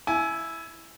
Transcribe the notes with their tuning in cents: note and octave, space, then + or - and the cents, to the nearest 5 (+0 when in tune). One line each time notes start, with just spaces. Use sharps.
E4 +0 G#5 +25